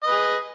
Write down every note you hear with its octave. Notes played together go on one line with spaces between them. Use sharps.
G#4 B4 D#5